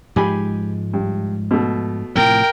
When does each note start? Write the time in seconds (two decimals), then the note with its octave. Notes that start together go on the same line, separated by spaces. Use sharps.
0.16 G#2 F3 G#3 G4 G#5 B5
0.94 G2
1.51 B2 A3
2.15 A2 C3 F3 A#4 G5